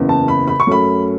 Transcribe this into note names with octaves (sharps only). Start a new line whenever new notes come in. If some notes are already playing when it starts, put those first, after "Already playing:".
Already playing: F#1 E2 C#3
A5
B5
B5
C#6
F#2 F#3 A3 C#4 B5